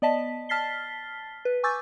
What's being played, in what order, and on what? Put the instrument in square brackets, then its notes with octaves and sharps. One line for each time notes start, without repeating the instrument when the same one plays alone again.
[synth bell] B3 D5 D#5 A5 B6
A5 F6 A6 B6 C7 G7
B4
G#5 C#6 D6 E6 G6 A6